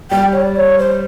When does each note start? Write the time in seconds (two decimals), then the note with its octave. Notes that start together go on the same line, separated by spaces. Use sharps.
0.11 G3 G5
0.32 C#5
0.41 D5
0.56 C#5
0.79 C5